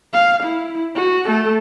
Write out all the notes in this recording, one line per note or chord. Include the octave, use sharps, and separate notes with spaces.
F5
E4
F#4
A3 A4